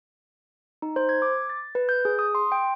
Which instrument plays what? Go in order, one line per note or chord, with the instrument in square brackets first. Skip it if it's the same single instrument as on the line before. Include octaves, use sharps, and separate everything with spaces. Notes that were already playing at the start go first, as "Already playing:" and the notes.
[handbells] D#4
C5
G#6
D6
A6
B4
G6
G#4
D#6
C6
G5